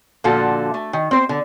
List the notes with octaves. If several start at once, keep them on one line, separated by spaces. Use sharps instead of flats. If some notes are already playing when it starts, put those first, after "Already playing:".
A#2 D3 F3 F#4 A4
A3
D#3
C4 C5
D3